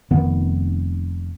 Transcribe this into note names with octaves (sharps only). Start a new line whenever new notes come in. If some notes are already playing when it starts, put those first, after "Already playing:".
F1 D#3 B3